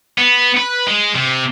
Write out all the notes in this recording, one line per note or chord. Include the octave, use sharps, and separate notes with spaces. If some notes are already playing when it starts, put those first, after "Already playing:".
B3
B4
G#3
C3